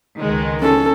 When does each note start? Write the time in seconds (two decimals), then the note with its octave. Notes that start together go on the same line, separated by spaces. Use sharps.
0.22 C#2 D#3 G#3
0.60 C#4 A4